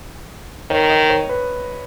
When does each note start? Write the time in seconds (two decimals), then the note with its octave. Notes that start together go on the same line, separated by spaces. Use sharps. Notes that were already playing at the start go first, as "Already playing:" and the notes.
0.70 D#3 C#5
0.90 D#5
1.10 C#5
1.29 B4